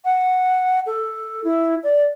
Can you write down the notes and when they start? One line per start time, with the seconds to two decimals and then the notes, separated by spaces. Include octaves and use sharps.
0.04 F#5
0.86 A4
1.44 E4
1.83 D5